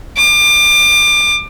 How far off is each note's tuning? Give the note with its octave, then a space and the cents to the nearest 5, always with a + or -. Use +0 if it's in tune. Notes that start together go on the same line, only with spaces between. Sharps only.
D6 +30